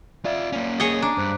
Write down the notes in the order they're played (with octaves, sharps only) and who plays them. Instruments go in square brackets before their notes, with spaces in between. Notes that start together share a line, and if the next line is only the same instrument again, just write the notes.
[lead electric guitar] F4 E5 [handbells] D5 F5
[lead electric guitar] A#3 C#4
[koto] G#4 C#5 D#5 [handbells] G#5 A6
[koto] D4 [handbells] A#5
[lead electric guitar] G2 [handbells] C5 F#6 B6